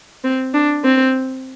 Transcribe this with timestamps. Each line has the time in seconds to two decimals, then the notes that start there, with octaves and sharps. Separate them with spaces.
0.24 C4
0.54 D4
0.84 C4